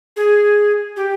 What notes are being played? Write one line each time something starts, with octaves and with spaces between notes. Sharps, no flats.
G#4
G4